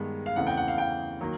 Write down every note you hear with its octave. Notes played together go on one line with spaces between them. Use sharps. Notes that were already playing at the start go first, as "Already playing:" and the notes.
Already playing: G2 D#3 G#3 B3
F5
E2 C#3 E3 A3 C4 F#5
G5
F#5
F5
G5
D#3 F#3 A#3